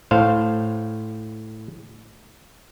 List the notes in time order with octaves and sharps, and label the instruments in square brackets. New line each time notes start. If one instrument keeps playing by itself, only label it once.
[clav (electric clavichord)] A2 C5 F5